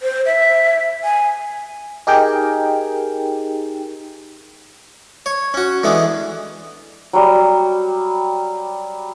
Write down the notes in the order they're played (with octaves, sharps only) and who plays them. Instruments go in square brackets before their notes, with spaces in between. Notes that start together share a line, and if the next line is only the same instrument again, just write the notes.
[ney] C5
E5
G#5
[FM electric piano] D#4 G4 G#4 A#4 G5
[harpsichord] C#5
C#4 F#4
D3 E3 G#3 B3
[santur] F#3 G3